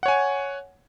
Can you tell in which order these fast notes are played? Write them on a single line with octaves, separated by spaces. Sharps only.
F#5 C#5 G#5